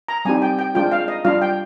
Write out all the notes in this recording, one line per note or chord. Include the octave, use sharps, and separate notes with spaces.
A#5
G3 C4 D#4 G4 G#5
G5
G5
G#3 D4 F4 G5
F5
D#5
G3 D4 F4 F5
G5